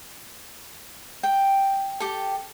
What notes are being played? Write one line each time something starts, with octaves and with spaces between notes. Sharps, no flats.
G5
G4 A4